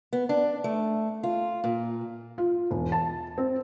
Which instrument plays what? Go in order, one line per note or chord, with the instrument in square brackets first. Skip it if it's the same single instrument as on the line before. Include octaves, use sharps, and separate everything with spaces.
[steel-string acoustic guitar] B3
D4
A3
F4
A#2
[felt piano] F4
E1
A5
C4